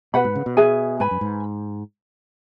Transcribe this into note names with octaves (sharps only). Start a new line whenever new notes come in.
B2 B4 F#5 B5
G#2
C#3
B2
G#4 E5 G#5
G#2 B4 G#5 B5
F#2
G#2